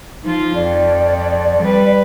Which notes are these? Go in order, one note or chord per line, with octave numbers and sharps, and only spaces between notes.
F3 D#4 F4
F2 D5
G3 B4